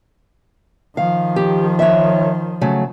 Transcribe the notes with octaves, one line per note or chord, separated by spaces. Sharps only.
D#3 F3 F5
G4
C#5 E5
C#3 F#3 A3